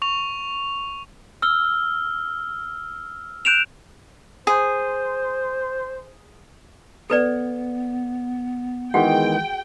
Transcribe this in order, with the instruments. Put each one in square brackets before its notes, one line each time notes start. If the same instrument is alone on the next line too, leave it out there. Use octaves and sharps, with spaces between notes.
[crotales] C#6 F7
[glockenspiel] E6 F6 G7
F#6 G6 D7 E7 F7
[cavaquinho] G#4 [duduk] C5
[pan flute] B3 [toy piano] A4 B4 D5
[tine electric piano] D#3 E3 G#3 [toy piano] F#4 G#4 F#5 [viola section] G5